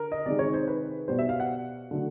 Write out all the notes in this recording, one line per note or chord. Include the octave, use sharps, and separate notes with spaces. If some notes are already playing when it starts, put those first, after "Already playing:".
Already playing: D3 A#4
D#5
C3 D#3 G#3 D5
C#5
C5
B4
B2 G3 C5
E5
F5
F#5
D3 F#3 A3